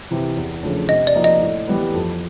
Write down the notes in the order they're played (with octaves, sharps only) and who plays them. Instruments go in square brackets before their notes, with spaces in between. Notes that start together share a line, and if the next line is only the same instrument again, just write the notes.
[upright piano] C3 E3
E2
C#3 F3 A3 D4
[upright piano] C3 [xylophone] D#5
[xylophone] D5
[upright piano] F3 A#3 D#4 F#4
[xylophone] D#5
[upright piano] A2
E3 G3 B3
F2